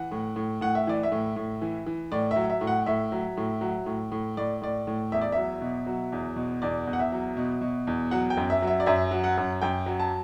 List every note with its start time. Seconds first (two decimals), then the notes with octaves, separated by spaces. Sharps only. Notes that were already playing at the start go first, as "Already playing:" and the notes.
Already playing: E3 F#5
0.11 A2
0.36 A2
0.61 A2 F#5
0.75 E5
0.87 E3 D5
1.03 E5
1.12 A2
1.36 A2
1.62 E3
1.86 E3
2.12 A2 D5
2.31 E5
2.36 F#3
2.50 E5
2.61 A2
2.67 F#5
2.86 A2 E5
3.12 F#3
3.37 A2
3.61 F#3
3.86 A2
4.12 A2
4.37 A2 D5
4.62 A2 D5
4.87 A2
5.12 E2 E5
5.22 D5
5.32 F#3 E5
5.61 B2
5.86 F#3
6.12 E2
6.36 B2
6.62 E2 D5
6.87 E2
6.93 F#5
6.99 E5
7.12 F#3
7.37 B2
7.61 B2
7.87 E2
8.11 F#3 F#5
8.30 G5
8.37 F#2
8.50 E5
8.62 F#3
8.67 E5
8.80 D5
8.86 F#2 E5
9.11 F#3
9.24 F#5
9.37 F#2
9.62 F#2 G5
9.86 F#3
10.00 A5